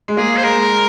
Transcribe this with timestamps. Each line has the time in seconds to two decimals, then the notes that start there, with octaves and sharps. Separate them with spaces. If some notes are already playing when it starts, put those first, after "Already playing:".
0.08 G#3
0.17 A#3 G#4
0.37 C5
0.44 G#3 A#4